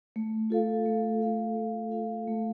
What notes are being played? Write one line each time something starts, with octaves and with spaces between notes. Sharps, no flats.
A3
F4 A4 F5
A3
F4 A4 F5
A3
F4 A4 F5
A3